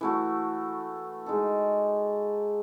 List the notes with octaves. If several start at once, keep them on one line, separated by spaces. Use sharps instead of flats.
E3 A3 F#4
G#3 D#4 A4